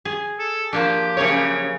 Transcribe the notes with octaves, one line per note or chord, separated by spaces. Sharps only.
G#4
A4
F3 A#3 D4 G4
F#2 C#3 A#3 G#4 C#5